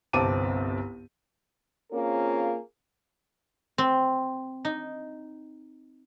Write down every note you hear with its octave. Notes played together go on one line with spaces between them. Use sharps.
G1 C2 C4 A5 D6 D#7
A#3 C4 C#4 F4 G#4 A#4
C4
D#4